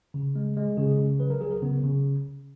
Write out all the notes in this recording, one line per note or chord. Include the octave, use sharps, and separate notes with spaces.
C#3
G#3
G#3
C#3 G#4
C#3
F#3 B4
A#4
F#3 G#4
A#4
C#3 B3
C#3